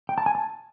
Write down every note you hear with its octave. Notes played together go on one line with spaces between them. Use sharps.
G5
A5
G#5
A5